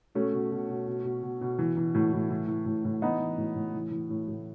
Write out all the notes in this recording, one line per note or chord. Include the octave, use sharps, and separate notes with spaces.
B2 A3 C#4
B2
B2
B2
B2
B2
B2
B2
E3
E3
A2
A2
E3
E3
A2
A2
E3 B3 D#4
E3
A2
A2
E3
E3
A2
A2